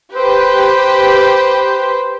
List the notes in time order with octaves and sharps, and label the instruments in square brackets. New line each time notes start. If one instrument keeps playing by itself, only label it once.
[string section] G4 B4 [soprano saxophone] C5